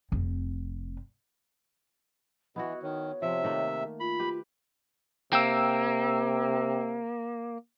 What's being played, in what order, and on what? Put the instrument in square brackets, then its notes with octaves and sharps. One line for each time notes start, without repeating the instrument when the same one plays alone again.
[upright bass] F1 C4
[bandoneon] E3 [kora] B3 E4 F#4 [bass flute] D#5
[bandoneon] D#3 [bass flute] C#5
[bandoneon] C3 E5 [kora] F3
[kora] D#3 A3 A#3
[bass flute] F4 [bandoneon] B5
[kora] G4 B4
[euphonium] C3 [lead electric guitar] A#3 [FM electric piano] G5 E6